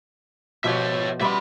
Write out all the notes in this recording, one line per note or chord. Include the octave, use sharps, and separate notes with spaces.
B2 F3 G4 C#5 E5
G3 B3 D5 E5 C6